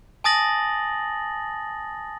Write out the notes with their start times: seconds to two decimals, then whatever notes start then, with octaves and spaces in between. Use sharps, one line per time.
0.24 G#5 A5 D#6 A6 A#6 F#7